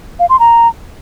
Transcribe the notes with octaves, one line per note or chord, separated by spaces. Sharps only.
F5
C6
A#5